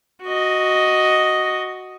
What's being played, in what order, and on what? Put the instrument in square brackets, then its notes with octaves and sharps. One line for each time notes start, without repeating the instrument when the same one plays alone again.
[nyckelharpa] F#4 D#5